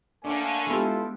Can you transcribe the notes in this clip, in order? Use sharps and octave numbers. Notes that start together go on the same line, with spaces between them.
D3 A3 A#3 C#4 D4 G#5
G#3 B3 E4 F4 G4 A4